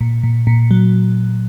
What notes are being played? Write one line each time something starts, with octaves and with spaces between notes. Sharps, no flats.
A#2
A#2
A#2
F#3